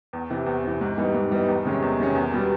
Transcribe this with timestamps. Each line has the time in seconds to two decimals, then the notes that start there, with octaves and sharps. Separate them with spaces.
0.13 E2
0.30 C3 E3
0.46 E2
0.64 C3 E3
0.81 G#2
0.97 E3 G3 B3 D#4
1.14 G#2
1.31 E3 G3 B3 D#4
1.48 E2
1.65 C3 D#3 G#3 C#4
1.82 E2
1.99 C3 D#3 G#3 C#4
2.15 E2
2.32 B2 G3 B3